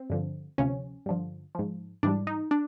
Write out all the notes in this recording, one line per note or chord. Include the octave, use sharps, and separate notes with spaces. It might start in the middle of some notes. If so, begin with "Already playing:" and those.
Already playing: C4
G2 D3 F3
D2 C3 F3 C#4
G2 D3 F3
G#2 F3
G#2 E3 G3 D4
D#4
D4